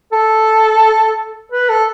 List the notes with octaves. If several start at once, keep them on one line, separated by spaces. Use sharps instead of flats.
A4
B4
A4